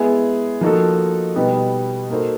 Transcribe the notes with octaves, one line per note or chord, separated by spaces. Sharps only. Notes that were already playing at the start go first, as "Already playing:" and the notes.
Already playing: G#3 B3 E4 G#4
F3 A#3 D#4 F#4 A4
B2 G3 B3 D#4 G4
A#3 D#4 F#4 A4 C5